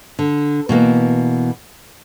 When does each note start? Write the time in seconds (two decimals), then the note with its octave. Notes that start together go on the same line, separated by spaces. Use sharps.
0.19 D3
0.69 B2 E3 A#3 B3